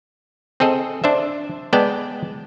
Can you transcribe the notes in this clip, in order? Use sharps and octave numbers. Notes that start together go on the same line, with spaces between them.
C4 G#4 A4 D#5
D4 C5 E5
G#3 B3 D5 G5 A5